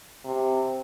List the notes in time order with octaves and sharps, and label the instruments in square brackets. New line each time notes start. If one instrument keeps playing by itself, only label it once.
[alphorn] C3